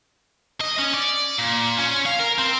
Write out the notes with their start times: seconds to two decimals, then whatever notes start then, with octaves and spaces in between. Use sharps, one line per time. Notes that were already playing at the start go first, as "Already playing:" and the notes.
0.61 D#5
0.79 C#4
0.94 D5
1.38 A#2
1.78 C#4
2.06 F5
2.20 A#4
2.39 C4